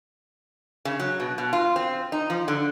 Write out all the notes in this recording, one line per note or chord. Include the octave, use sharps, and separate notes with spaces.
C#3
F#3
B2
B2
F4
C4
D#4
F3
D3